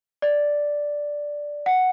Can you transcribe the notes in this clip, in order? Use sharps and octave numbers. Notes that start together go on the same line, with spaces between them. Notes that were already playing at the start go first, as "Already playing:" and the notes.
D5
F#5